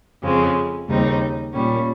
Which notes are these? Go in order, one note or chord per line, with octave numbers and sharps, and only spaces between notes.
F2 C#3 G#3 C4
D#2 C#3 G3 C4 D#4
A#2 G3 C#4